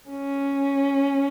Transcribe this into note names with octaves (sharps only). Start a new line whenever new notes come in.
C#4